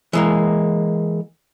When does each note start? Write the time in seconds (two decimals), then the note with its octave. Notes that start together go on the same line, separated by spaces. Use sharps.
0.13 E3 G#3 A#3